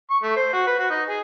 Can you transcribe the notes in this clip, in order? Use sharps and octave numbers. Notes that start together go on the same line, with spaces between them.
C#6
A3
C5
F#4
B4
F#4
D#4
G#4